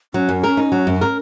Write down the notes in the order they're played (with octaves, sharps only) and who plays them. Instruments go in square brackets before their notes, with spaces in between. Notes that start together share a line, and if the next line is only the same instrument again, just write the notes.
[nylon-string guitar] F#3 [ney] C#4
[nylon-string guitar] F#2
A#4
D#4
F#3
F#2
A#4